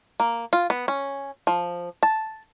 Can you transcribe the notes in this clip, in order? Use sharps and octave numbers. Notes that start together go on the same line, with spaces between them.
A#3
F4
B3
C#4
F3
A5